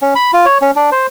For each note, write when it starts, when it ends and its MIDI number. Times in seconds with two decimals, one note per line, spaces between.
0.02 0.14 61
0.15 0.31 83
0.33 0.45 65
0.46 0.58 73
0.62 0.71 61
0.76 0.90 62
0.92 1.07 72